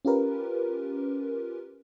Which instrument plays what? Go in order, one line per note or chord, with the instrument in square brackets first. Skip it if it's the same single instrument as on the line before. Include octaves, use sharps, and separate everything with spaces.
[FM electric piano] C#4 F4 G4 A#4 B4